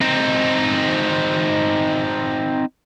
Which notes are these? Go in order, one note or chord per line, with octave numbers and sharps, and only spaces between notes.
C4 D#4